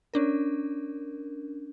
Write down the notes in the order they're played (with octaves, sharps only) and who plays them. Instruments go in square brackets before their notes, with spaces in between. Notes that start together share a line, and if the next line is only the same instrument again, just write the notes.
[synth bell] C#4 D4 A#4